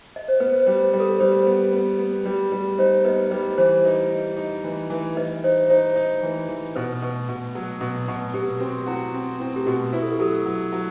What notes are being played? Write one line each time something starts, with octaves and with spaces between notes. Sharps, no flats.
D#5
C5
B3 B4
C5
G3
B4
G3
A4
G3 C5
B3
B3
B3
G3
G3
D#4 C5
B3 B4 D#5
G3 B4 D#5
E3 C5
D#4
D#4
D#4
E3
E3
E3 B4 D#5
D#4 C5
D#4 C5
D#4
E3
E3
B2 B4
B2
B2
F#3
B2
B2
B2 G4
C4 F#4
E4 F#4
C4
C4 E4
G4
B2 F#4
E4 B4
A4
G4
F#3 A4
F#3
F#3